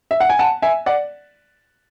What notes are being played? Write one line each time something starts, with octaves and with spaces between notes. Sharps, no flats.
E5
F#5
G#5
F#5 A5
E5 G#5
D5 F#5